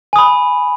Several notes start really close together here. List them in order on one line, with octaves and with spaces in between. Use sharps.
G#5 D#6 B5